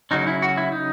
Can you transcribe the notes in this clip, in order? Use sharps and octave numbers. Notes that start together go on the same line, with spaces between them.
C#3 F#3 C#4 D#4
E4
F#4
E4
D#4